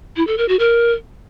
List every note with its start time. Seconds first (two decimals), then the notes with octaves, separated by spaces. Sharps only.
0.16 E4
0.27 A4
0.38 A#4
0.49 F#4
0.59 A#4